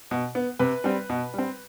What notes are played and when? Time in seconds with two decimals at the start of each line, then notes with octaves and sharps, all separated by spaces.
0.11 B2
0.35 B3
0.59 C3 B4
0.84 G3 C4
1.10 B2
1.34 G3 C4